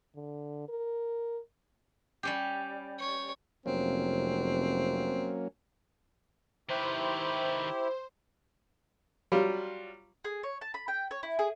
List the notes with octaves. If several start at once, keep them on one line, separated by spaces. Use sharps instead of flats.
D3
A#4
G3 C#4 G4
C#5
F1 F#3 A#3 C4 C#4
D#3 E4 G4 B4 C5
F#3 G3 F4
G#4
C#5
A5
B5
G5
C#5
E4
G#4